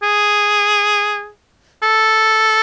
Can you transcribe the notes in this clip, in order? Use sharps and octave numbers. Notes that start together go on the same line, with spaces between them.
G#4
A4